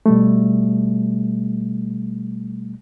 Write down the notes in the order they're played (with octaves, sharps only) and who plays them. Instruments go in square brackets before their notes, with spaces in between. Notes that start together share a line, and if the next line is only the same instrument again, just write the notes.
[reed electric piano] B2 G3 A3